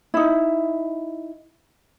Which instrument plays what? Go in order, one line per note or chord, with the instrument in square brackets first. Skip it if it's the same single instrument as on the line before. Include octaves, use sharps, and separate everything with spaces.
[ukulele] D#4 E4